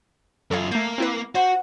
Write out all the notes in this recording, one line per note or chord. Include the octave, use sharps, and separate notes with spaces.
F#2 F4 A4 C#5 F5
A3 A#3 G6
C4 E4 B4
F#4 C5 F#5